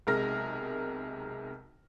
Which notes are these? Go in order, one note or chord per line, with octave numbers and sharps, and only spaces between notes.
B1 C3 G#3 A#4 F6 A#6